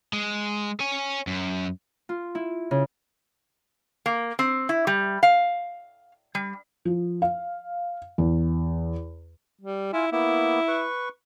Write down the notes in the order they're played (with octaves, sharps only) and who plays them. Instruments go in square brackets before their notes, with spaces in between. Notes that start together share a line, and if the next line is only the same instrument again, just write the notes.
[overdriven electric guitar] G#3
C#5 G#5
F#2
[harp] F4
E4
C#3
[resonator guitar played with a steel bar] A#3
C4
E4
G3
F5
G3
[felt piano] F3
F5
E2
[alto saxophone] G3
[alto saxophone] E4 [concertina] F4 G#5
[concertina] A#3 B3 [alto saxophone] E4
[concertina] B4 C#6